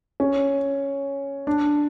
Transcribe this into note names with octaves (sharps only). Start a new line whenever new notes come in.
C#4
D4